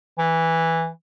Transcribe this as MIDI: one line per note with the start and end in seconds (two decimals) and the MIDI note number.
0.18 0.88 52